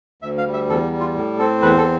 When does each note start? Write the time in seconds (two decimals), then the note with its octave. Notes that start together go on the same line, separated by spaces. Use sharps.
0.22 D2 E5
0.38 F5
0.46 G3
0.54 E5
0.69 E2 A4
0.92 G3
1.00 F4
1.15 A2
1.39 C4 A4
1.62 E2 B4
1.78 A4